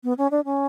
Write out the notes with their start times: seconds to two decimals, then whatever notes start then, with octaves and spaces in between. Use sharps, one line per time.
0.04 B3
0.18 C#4
0.31 D4
0.45 C#4